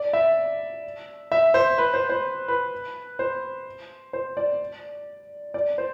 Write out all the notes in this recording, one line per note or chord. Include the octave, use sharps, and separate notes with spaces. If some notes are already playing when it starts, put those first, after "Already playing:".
Already playing: D5
E5
E5
C5
B4
C5
C5
B4
C5
C5
D5
D5
C5